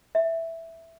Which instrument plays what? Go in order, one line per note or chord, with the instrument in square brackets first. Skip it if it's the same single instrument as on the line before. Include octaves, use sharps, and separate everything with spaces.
[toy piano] E5